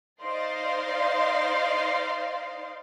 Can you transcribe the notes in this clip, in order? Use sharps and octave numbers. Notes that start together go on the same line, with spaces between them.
D#4 C5 D5 D#5 F5 C6